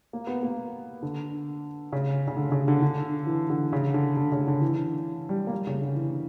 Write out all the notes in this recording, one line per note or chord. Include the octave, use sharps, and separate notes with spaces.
A#3
B3
A#3
D3
C#3
C#3
D3
C#3
D3
D3
E3
D3
C#3
D3
D3
C#3
D3
E3
G3
A#3
G3
C#3
D3
E3